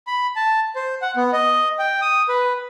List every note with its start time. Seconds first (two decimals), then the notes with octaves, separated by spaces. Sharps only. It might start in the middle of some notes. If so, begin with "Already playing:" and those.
0.07 B5
0.36 A5
0.76 C5
1.02 F#5
1.16 B3
1.33 D#5
1.79 G5
2.02 D#6
2.29 B4